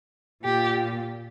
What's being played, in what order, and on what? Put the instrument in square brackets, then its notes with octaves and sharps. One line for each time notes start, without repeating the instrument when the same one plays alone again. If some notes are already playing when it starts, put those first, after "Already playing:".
[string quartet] A#2 G4